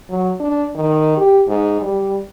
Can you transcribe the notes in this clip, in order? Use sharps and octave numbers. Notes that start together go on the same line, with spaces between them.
F#3
D4
D#3
G4
G#2
G3